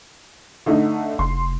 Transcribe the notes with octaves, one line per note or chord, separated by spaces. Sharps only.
D3 A3 D#4
F1 C6